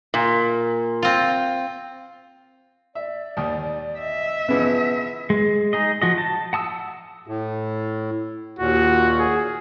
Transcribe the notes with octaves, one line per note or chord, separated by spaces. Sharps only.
A#2
C4 F4
D5 E5
D#2 D#3
D#5 E5
C#3 E3 F3 B3
G#3
D#4 G#4 D#5
F3 F#4 D#5
A5
F#5 A5 D#6 E6
A2
D#2 A#2 F#4
G#4